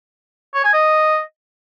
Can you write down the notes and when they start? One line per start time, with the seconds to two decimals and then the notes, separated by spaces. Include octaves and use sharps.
0.54 C#5
0.64 G#5
0.73 D#5